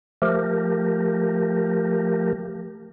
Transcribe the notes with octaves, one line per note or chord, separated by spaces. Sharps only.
F3 A3 G4 A#4